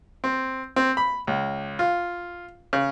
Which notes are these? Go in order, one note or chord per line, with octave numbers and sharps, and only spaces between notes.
C4
C4
B5
C#2
F4
C#3